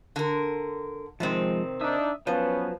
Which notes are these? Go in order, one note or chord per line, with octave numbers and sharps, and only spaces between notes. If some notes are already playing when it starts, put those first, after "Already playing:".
D3 A#4
C3 D#3 F3 G#3 C4
D4 D#4 E5 D#6 E6
F3 F#3 B3 C#4 B4 C5